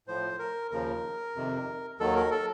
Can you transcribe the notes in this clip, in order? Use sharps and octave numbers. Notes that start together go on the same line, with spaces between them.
A2 F3 C5
A#4
D#2 C#3 F3 A#4
F2 C3 D#3
D#2 D#3 F#3 A4
A#4
A4